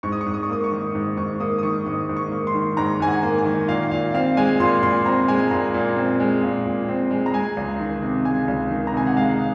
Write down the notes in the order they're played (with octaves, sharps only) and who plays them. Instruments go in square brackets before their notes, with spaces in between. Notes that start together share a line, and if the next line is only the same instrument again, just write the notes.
[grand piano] G#2 C#6
D#6
C#6
G#2
D#6
C#6
A#3 D#6
C#6
D#3
G#2
G#2 C#6
A#3 D#6
D#6
D#3 C#6
G#2 D#6
G#2
C#6
A#3
C6
D#3
G#2 A#5
G#2 G#5
F#5
A#3
G#5
D#3
A#2 F5
A#2 F5
C4 F5
G#3 G#5
A#2 C6
A#2 C6
C4 A#5
G#3 G#5
A#2 A#5
A#2
C4
G#3
A#2
A#2
C4
G#3
A#5
G#3 G#5
C#2
D#3
C3
G#3 G#5
C#2
D#3
A#5
C3 G#5
F#5
G#3 F5